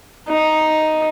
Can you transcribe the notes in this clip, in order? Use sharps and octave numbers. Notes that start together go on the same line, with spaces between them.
D#4